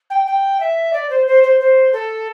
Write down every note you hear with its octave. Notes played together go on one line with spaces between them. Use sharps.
G5
G5
E5
D5
C5
C5
C5
C5
A4